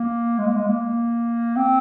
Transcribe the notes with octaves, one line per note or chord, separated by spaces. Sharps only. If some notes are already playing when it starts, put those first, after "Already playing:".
Already playing: A#3
G#3
A#3
G#3
A#3
C4